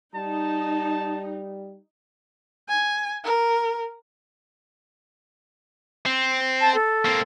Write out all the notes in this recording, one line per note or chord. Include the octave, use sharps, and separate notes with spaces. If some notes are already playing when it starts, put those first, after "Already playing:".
G3 D#4 A5
G#5
A#4
C4
A5
A4
A#3 C4